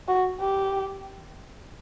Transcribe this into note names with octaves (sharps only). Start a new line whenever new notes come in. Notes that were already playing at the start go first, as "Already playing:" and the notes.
F#4
G4